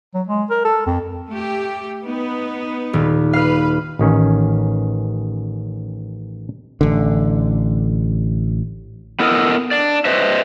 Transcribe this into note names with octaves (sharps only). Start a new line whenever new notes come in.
F#3
G#3
A#4
A4
F2
A3 G4
B3 D#4 B4
D#1
B4 F5 F6
A1 D#3 C#4
A1 D3
B3 E4 A4 A#4 D#5
D4 D5
B4 C5 D#5 E5